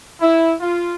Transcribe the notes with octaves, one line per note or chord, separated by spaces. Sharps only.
E4
F4